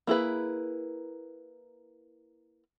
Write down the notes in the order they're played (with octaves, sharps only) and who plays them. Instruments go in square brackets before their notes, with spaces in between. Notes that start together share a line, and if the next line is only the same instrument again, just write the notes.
[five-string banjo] A#3 E4 G#4 B4